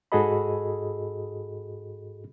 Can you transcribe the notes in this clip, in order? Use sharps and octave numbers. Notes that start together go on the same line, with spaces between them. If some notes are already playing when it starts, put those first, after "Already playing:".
G#2 F#4 G#4 A4 D#5 B5